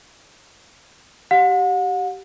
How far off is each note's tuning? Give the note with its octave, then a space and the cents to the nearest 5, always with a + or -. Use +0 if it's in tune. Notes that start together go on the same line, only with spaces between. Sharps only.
G4 -20 F#5 -40